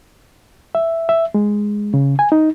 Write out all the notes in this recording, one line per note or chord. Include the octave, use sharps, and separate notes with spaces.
E5
E5
G#3
C#3
G#5
D#4